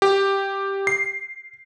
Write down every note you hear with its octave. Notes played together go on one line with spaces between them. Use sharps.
G4
C7